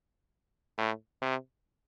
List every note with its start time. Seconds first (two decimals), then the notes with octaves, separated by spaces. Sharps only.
0.78 A2
1.22 C3